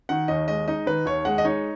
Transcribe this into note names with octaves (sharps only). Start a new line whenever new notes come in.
D#3 F#5
D#2 D#5
G#3 D#5
D#4 D#5
D#3 B4
D#2 C#5
G#3 F#5
D#5
D#4 C#5